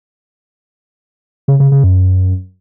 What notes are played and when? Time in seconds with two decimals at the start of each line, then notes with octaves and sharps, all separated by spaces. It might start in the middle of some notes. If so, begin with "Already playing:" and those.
1.48 C#3
1.60 C#3
1.72 C#3
1.84 F#2